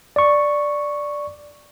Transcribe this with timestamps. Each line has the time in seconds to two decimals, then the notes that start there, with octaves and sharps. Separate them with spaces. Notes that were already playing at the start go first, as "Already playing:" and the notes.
0.16 D5 C#6